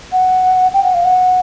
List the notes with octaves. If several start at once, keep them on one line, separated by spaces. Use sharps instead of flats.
F#5
G5
F#5
F5
F#5